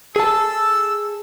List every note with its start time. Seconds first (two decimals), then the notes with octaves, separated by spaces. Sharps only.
0.16 G#4 A4 A5 E6